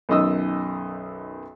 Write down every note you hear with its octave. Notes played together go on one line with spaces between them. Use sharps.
B1 F#2 D#3 D#5 D#6 E6